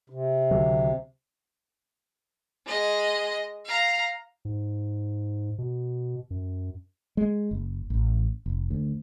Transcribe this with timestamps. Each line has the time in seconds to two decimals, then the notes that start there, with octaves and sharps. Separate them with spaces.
0.10 C3
0.51 C#2 D3 F#3
2.66 G#3 D#5
3.65 F5 A#5
4.45 G#2
5.58 B2
6.30 F#2
7.17 G#3
7.51 F#1
7.90 A1
8.46 F1
8.70 D2